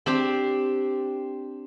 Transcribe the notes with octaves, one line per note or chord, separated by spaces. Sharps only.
C4 D4 G4